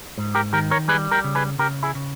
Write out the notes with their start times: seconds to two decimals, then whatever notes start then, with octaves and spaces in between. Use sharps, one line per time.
0.18 G#2
0.35 G4 A#4
0.53 D#3 G4 A#4
0.71 A#4 C#5
0.88 G3 G#4 B4
1.11 G4 A#4
1.24 C#3
1.35 G#4 B4
1.59 C#3 G4 A#4
1.83 E4 G#4
1.95 C#3